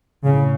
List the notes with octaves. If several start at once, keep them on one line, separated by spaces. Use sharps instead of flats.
A2 C#3